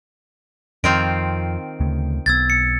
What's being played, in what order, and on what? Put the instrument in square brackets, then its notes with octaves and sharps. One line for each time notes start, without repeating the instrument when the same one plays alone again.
[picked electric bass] F2 [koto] D#3 C4 F4 [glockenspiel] D7
[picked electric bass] D2 C#3 A3
[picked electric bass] B1 B3 [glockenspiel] E6 G#6 A6
[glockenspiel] C#7